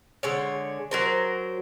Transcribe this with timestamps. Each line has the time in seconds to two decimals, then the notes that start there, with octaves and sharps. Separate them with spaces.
0.23 D3 G#3 C#5
0.91 F#3 A#4 C5